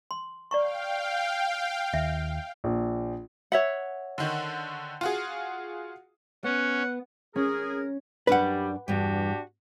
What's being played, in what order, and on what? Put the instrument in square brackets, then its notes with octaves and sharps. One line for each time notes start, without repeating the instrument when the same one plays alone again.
[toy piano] C6
[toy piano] D5 A#5 C#6 [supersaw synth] F5 G5
[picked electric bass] D#2 [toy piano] E5
[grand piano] A#1
[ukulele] C#5 E5 F#5
[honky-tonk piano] D3 D#3
F4 F#4 G#4
[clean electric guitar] B3 [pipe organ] C#4 [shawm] F#5
[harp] C#4 [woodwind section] G#4 A#4
[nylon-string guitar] F#2 D4 D5 [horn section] G3 [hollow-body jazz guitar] B4 F#5
[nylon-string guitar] E2 G2 [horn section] D4 F#4 G4